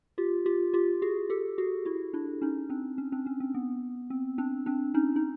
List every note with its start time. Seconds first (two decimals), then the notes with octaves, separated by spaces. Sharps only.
0.18 F4 G4
0.46 F4 G4
0.74 F4 G4
1.02 F#4 G#4
1.30 G4 A4
1.58 F#4 G#4
1.85 E4 F#4
2.13 D4 E4
2.41 C#4 D#4
2.70 C4 D4
2.98 C#4
3.12 C4 D4
3.26 C#4
3.40 C4
3.54 B3
4.10 C4
4.38 C4 D4
4.66 C4 D4
4.94 C#4 D#4
5.16 D#4